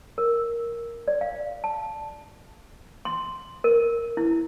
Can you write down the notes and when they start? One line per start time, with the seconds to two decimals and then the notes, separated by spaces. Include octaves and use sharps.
0.18 A#4
1.08 D5
1.21 F5
1.64 A5
3.05 C6
3.64 A#4
4.17 E4